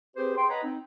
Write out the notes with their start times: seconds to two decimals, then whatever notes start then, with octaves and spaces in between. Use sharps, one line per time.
0.17 C4 G4 G#4 B4 C5
0.36 G#4 G5 C6
0.49 B4 C#5 D#5 F#5 A#5 B5
0.63 C4 D#4